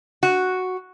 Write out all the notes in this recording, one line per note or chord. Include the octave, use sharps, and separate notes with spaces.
F#4